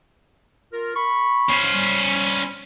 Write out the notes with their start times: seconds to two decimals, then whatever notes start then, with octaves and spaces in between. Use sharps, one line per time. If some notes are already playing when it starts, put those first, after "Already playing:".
0.72 F4 A#4
0.95 B5 C#6
1.49 C#4 C5
1.72 G3